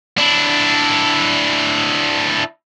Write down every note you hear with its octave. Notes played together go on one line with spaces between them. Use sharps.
D4 E4